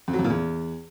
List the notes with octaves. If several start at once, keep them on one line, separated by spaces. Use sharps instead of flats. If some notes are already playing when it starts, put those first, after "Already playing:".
F2
F#3
F2
A#2
E2